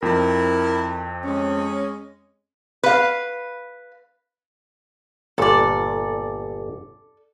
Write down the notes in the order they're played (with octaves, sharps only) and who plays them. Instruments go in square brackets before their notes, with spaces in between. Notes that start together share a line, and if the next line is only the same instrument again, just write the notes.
[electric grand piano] F2 C4 [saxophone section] E4 A#4
[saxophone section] G#3 C#4
[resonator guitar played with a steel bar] B4 F5
[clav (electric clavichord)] G1 A#2 [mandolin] A4 D5